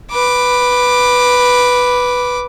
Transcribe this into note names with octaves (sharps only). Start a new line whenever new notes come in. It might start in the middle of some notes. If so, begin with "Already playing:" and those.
B4 D6